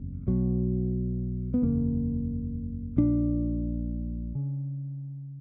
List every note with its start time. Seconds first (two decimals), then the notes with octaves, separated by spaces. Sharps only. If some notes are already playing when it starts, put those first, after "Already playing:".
Already playing: F#1 E2 C#3
0.27 B1 B2 F#3
1.54 B3
1.62 F#1 E2 C#3 A#3
2.97 A#1 A#2 D4
4.35 C#3